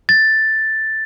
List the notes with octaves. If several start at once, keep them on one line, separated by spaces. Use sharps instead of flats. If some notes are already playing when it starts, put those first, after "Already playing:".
A6